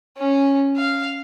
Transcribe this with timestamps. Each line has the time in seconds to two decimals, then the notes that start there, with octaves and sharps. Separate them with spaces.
0.17 C#4
0.77 F5